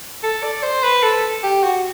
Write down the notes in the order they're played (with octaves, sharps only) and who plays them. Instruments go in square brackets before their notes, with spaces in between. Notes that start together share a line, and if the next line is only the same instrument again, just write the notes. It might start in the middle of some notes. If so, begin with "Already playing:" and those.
[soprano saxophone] A4
D5
C5
B4
A4
G4
F#4